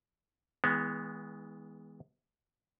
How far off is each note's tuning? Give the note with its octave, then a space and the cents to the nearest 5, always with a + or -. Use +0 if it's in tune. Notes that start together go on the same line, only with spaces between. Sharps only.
E3 -35 G#3 -5 B3 +0